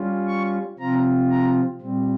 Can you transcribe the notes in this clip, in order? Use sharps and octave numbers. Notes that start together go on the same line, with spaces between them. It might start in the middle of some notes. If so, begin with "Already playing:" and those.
Already playing: G3 C#4 F4
C#6
C3 F3 C4 F4 A#5
A#5
A#2 G3 C4